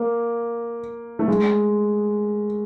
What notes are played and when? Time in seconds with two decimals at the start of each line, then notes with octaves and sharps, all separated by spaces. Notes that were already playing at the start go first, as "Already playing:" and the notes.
Already playing: A#3
1.19 A3
1.28 G#3